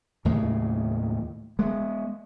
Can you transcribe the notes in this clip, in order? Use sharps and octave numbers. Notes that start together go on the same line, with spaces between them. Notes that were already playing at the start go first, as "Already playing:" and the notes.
D#2 A2 C#3 G#3
G#3 B3